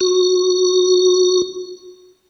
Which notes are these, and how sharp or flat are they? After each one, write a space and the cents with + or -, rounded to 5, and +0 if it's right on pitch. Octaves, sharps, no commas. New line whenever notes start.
F#4 -20